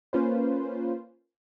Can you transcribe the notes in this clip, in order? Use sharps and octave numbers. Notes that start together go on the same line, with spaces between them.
A#3 C#4 F4 B4 C5